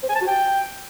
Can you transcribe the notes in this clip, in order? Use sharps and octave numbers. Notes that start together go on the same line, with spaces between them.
C5
G#5
A5
F#4
G5